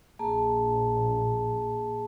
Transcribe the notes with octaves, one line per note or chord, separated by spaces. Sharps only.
A#1 A#3 G#4 A5